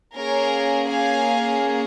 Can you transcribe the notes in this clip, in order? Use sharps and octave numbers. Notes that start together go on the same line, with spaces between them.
A#3 C#4 G#4 A#4 C#5
F5 G#5